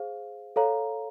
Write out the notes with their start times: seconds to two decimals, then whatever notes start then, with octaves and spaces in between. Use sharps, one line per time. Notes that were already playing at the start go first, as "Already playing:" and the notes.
Already playing: G#4 C5 F5
0.56 A4 C#5 F5 A#5